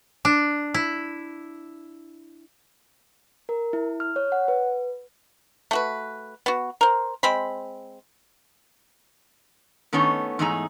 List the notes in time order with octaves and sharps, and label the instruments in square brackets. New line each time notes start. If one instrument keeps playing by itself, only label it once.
[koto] D4
E4
[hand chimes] A#4
E4
F6
C#5
F#5
B4
[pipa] A3 F#4 B4
B3 F#4
A#4 C5
G#3 C4 B5
[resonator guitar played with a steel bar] D#3 A3 B3 C#4 D#4 C#5
E2 G#2 A3 D#4 G#4 A#5